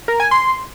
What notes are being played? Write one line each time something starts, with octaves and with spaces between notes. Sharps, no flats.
A#4
G#5
C6